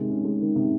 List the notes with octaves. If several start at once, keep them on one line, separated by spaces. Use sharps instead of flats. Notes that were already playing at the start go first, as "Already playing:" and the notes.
Already playing: C3 D#3 G#3
C#4
G#3
D#3
C3